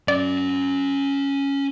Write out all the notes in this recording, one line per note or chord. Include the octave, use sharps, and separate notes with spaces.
C#4 D5 F#5